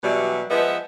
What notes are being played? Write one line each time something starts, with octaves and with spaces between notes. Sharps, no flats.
B2 E3 F#3 G3
F3 G#3 B3 B4 E5